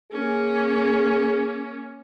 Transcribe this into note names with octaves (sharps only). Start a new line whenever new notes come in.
A#3 C#4 G#4